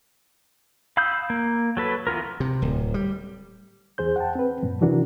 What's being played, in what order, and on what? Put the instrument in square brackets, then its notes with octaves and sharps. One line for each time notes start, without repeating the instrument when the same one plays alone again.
[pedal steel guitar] F5 B5 D#6 E6 G6
A#3
F#3 A4 B4
E3 B3 F4 A#4
[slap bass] C3
D1
G3
[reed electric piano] E2 G#4 C5 G6
F#5 G5 A5
C4 B4
F#2 A#2
C3 E3 D4 F#4 A#4